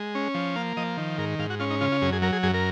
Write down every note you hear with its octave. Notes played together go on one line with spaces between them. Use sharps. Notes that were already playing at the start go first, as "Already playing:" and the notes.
Already playing: G#3
C#4
F3
A#3 F5
F3 D#5
D#3
G#2 A#4
G#2 F5
F#4
C#4 F4
D#4
C#3 F4
F4
F#2 G#4
G#4
F#3 A#4
G#4
F#2 G#4
A#4